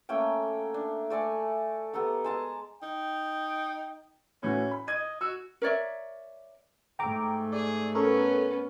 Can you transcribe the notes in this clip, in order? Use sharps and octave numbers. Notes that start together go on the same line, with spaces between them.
A3 A#3 C#4 G5
D4
A3 D5 G#5 C#6
B3 G4 A4 A#5
G#3 A5 A#5
D#4 G5
A2 E3 C#4 F#4
B5
D#5 G#6 D#7
F#4 E6
A#4 C#5 D5 E5
G#2 A3 G5 A#5 D6
G#4 D5
B3 C#4 A4 A#4 C#5